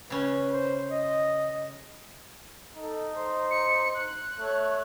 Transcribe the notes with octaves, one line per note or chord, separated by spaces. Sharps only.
C#3 C#4 B4
C5
D#5
D#4 A4
C5
C#7
F#6
A3 C#5